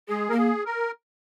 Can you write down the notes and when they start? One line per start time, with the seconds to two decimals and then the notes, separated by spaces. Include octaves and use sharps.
0.08 G#3 G#4
0.30 A#3 A#4
0.37 G#4
0.65 A#4